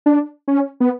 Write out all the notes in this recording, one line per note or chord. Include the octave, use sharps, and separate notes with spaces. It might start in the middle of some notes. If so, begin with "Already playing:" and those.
D4
C#4
B3